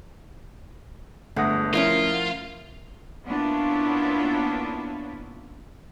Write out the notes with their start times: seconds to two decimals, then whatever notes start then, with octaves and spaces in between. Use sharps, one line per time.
1.36 G1 G#3 A3 D4 F#5 D#6 A#6
1.74 F3 C#4 E4 F4 A#4
3.25 A#3 B3 C#4 D4 E4 F4